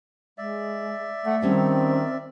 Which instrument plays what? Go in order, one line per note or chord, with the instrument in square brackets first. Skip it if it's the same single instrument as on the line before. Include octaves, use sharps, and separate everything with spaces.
[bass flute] G#3 [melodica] D5 E5
[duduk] A3 [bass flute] F#5
[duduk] D#3 [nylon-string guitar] G3 C#4 A5 [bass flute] C4